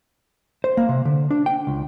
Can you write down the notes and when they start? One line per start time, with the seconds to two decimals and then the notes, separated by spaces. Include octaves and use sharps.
0.64 C5
0.77 A#3
0.89 C3
1.05 D3
1.31 D4
1.46 G5
1.67 C#2